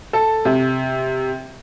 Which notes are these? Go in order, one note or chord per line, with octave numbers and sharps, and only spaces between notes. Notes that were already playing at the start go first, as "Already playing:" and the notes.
A4
C3